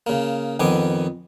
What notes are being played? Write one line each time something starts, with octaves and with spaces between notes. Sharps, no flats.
C#3 A#3
F2 D#3 B3 G#5 D6